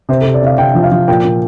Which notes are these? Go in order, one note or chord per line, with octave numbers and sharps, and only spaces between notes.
C3 C5
A4
C3
D5
C3 F5
C3 G5
F3
F5
F3
A#2 G5
A#2